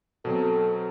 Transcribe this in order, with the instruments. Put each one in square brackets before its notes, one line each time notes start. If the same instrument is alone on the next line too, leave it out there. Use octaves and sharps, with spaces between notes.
[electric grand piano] B2 F#3 C4 [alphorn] A4